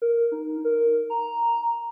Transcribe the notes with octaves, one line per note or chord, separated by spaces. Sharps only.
A#4
D#4
A#4
A#5